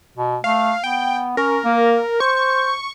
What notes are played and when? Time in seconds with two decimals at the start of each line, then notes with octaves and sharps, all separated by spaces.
0.17 B2
0.44 A3 F5
0.84 B3 G5
1.37 C#4 A#4
1.65 A#3
2.20 C5 C#6